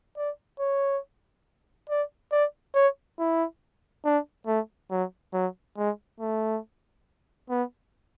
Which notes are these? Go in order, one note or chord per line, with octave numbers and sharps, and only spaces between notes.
D5
C#5
D5
D5
C#5
E4
D4
A3
F#3
F#3
G#3
A3
B3